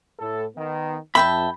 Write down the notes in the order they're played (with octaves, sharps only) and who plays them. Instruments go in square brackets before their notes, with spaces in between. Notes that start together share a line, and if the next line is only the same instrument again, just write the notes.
[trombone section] A2 A4
D#3 B3
[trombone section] F2 [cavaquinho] E5 G5 A5 [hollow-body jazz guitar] B5